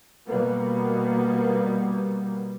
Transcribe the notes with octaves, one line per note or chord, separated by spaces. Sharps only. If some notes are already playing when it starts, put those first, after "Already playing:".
B2 G3 A#3 B3